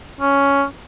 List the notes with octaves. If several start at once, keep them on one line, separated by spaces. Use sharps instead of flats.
C#4